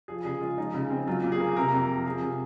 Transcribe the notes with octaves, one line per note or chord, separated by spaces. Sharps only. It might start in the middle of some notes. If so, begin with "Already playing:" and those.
F3 G#4
C#3 G#4
G#3 F4
F3 D#4
C#3
C4
F#3 F4
A#2
G#4
A#3
C3 A#4
F2
F3
F3 G#4
C3